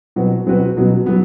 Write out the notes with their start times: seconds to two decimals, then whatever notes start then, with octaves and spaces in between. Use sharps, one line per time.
0.16 B2 F#3 C4 F#4 B4
0.46 B2 F#3 C4 F#4 B4
0.76 B2 F#3 B3
1.06 F#3 B3